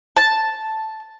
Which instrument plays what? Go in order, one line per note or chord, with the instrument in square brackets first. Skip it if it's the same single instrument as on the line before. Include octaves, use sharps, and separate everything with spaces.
[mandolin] A5